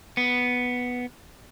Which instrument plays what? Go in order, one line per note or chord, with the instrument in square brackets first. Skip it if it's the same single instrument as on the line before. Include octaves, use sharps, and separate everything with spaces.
[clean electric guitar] B3